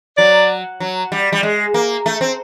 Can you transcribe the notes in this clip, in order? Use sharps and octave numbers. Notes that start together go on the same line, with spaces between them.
F#3 D5
F#3
G3
G3
G#3
A#3
A3
C4